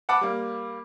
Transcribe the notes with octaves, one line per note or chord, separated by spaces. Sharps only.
F#5 A5 B5 D6
G3 A#3